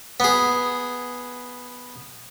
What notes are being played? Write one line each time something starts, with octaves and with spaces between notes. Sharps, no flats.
B3 G#4